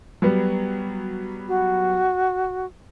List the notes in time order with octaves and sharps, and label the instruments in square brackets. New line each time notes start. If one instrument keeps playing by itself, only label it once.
[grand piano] F#3 G3 B3
[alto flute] F#4